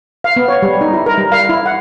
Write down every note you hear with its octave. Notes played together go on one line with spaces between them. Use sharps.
F5
B3
C#5
G3
D#4
E4
A#4
G3
F5
E4
F#5